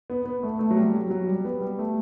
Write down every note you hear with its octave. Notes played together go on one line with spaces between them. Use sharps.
B3
B3
A3
A3
F#3
G3
F#3
F#3
G3
B3
G3
A3